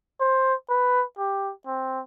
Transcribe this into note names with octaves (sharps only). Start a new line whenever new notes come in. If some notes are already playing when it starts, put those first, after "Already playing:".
C5
B4
G4
C4